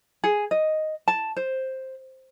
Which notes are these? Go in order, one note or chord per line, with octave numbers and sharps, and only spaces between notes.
G#4
D#5
A5
C5